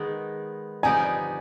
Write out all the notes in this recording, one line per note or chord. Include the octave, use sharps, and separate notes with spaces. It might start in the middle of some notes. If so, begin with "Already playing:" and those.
Already playing: D#3 G#3 B3 D#4
F3 B3 D#4 G4 D5 G#5